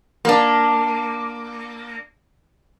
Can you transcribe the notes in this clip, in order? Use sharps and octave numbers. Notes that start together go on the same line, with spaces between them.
A#3 D4